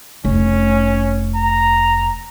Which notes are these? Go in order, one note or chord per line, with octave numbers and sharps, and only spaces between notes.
F1 C#4
A#5